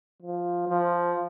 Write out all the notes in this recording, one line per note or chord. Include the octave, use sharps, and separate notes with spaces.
F3
F3